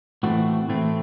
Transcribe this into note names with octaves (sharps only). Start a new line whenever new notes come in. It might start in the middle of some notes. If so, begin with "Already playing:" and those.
A2 E3 A3 C4 F#4
A2 E3 A3 C4